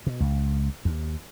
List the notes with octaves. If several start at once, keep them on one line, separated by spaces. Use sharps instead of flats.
B2
C#2
D#2